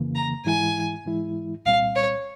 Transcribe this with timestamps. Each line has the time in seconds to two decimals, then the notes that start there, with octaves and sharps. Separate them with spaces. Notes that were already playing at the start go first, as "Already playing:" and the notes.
Already playing: F2 C#3 E3 A#3
0.15 A#5
0.45 G#2 E3 G#3 E4 G#5
1.05 G#2 E3 G#3 E4
1.65 C2 A#2 G3 C4 F5
1.96 C#5